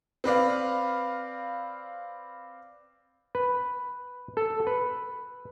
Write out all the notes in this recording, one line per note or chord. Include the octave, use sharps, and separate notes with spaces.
C4 B4 D5 F5
B4
A4
B4